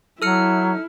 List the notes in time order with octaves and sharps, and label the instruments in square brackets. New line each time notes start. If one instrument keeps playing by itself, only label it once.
[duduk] F#3 [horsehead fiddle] E4 [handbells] A4 F6 C#7